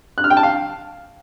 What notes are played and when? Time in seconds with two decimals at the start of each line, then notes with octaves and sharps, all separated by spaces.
0.18 F#6
0.24 F6
0.30 G5
0.37 A5
0.43 F5